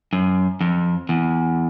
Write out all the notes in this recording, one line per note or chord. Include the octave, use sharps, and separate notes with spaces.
F#2
F2
E2